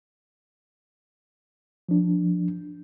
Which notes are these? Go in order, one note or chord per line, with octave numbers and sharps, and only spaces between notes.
F3 D4